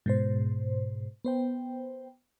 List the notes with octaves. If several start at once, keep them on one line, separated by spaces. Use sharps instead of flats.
G#2 B2 C5
B3 C5 G5